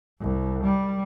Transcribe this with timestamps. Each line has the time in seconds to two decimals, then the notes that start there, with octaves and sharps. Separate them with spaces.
0.19 C2
0.64 G3